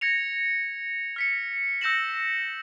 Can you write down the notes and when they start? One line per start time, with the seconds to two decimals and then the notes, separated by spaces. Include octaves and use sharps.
0.01 G#6 A#6 C#7 F7
1.16 F6 B6 C#7
1.81 E6 G6 A#6 C#7 E7 F#7